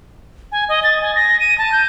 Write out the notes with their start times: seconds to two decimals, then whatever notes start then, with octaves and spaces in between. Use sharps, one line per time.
0.52 G#5
0.69 D#5
0.83 A6
1.01 G#5
1.15 A#6
1.40 D#7
1.58 A5
1.72 G6